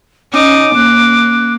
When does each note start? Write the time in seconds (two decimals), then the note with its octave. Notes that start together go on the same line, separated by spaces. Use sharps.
0.34 C#4 D#4 D6
0.76 A#3 F#6